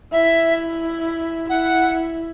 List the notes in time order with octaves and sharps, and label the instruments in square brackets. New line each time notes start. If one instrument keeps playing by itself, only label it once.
[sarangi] E4 [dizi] E5
[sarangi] E4 [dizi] F#5